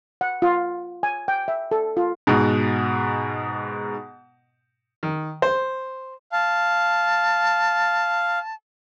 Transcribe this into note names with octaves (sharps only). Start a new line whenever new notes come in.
F#5
F4
G#5
G5
E5
A4
F4
G#2 B2
D#3
C5
F5 A5